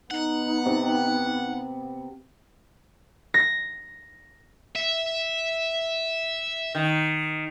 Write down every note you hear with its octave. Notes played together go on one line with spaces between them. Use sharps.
B3 D#4 F#5
C3
A#6
E5
D#3